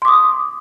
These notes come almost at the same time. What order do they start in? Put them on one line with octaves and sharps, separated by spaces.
C6 D6 D#6